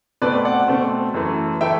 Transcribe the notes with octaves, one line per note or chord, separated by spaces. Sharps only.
B2 A3 C4 B4 D5
D5 F#5
B2 A3 C4
F#2 E3 A3
E3 A3 E5 G5